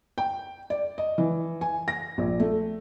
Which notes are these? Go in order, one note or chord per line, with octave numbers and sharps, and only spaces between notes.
G5
D5
D#5
E3
G#5
A#6
A#1
A3